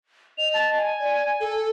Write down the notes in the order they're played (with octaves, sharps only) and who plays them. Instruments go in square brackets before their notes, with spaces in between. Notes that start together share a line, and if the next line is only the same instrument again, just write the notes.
[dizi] D#5 [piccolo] F7
[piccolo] A5
G#5
[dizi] D5
A4